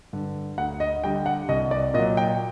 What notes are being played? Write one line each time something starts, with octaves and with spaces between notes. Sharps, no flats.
G2 D3
D2 F#5
D#5
D3 G3 G5
F#5
C2 D#5
D5
A#2 F#3 D#5
G5